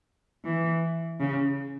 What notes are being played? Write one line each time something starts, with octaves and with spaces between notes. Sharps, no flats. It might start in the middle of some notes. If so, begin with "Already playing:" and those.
E3
C#3